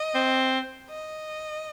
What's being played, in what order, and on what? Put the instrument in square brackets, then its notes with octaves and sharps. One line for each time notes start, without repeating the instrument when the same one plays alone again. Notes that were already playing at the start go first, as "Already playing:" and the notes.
Already playing: [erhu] D#5
[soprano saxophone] C4
[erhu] D#5